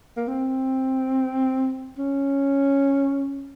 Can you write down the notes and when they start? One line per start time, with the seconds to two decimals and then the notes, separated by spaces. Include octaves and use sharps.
0.17 A#3
0.28 C4
1.98 C#4